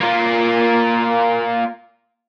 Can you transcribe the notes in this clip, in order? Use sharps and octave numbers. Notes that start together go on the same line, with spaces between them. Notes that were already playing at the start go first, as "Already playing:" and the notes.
A#3 F4